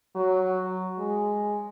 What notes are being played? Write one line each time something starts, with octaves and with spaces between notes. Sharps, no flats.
F#3
G#3